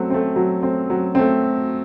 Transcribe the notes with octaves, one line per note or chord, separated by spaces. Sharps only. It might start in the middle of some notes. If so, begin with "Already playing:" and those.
Already playing: F#3 A3 C4
A3 C4
F#3
A3 C4
F#3
A3 C4